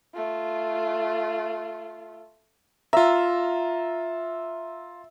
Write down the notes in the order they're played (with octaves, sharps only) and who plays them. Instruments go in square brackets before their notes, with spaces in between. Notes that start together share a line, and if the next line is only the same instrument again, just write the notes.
[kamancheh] A3 F4
[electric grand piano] F4 A#5 [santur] E5